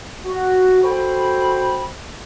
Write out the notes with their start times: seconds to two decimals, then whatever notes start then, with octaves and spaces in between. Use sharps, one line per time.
0.24 F#4
0.84 F#4 A4 C5 G5 B5